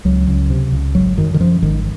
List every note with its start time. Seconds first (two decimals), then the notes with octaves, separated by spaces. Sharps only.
0.05 C#2 F#3
0.28 C#2
0.50 C3
0.72 C#2
0.95 G#1 F#3
1.17 F#2 D#3
1.34 D#3
1.39 F#2 F3
1.62 G#1 D#3